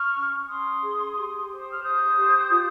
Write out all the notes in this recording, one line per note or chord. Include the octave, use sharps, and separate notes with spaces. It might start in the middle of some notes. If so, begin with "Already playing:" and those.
Already playing: C#6 F6
C#4
C#4 C6 D#6
G#4
G4
C5
D#6
F6
C5 D#6 G6
G4
F4